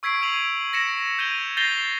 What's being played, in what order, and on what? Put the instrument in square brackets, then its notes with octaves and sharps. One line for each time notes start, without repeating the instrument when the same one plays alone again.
[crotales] C#6 E6 G#6 B6 C7 D7
E6 D#7 F7 F#7
A#6 B6 C#7 E7
G6 G#6 D#7 F7 G7
G6 A6 A#6 C7 F7 G7